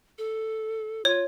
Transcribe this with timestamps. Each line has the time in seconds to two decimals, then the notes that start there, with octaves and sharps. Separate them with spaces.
0.18 A4
1.05 F4 C#5